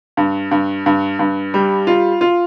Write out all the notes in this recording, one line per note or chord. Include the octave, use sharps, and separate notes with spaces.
G2
G2
G2
G2
G3
F4
F4